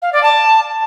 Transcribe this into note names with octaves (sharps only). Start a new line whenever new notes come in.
F5
D5
A5